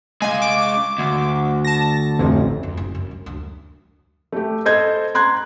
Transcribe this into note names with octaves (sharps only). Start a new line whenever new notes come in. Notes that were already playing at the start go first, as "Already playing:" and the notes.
G#3 F5 G#5
D6
D2
A5 A#6
A1 F2
F2
F#1
F#2
F3
D2
A3 G4
A4 C5 D#5 G6 G#6
A#5 C6 F#6 G#6